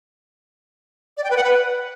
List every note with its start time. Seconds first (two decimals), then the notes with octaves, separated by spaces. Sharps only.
1.17 D5
1.24 G5
1.30 B4
1.37 F#5
1.44 B4